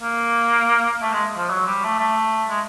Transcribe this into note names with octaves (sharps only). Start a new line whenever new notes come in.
A#3
A3
G#3
F3
F#3
G3
A3
A3
G#3